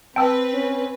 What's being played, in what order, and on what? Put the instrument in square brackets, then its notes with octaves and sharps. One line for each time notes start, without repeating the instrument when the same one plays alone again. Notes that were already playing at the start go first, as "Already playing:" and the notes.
[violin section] C4 B4 [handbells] G5 A5 E6
[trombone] C#4